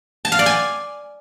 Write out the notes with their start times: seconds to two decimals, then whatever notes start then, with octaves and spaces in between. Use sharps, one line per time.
0.25 A5
0.32 F5
0.39 D5
0.46 G#5